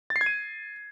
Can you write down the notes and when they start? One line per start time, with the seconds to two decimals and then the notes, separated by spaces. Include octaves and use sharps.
0.10 A6
0.16 C7
0.21 G#6
0.26 D#7